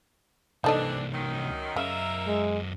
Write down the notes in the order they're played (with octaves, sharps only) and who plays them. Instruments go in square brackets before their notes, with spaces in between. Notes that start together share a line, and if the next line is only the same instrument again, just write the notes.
[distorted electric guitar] C2 A#3 [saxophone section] E3 C4 D4 [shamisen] D#4 A4 D#5
[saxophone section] F#2 D#3
[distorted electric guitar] F#2 D#5 [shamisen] C#3 [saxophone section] A#4 E5
[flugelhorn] G#3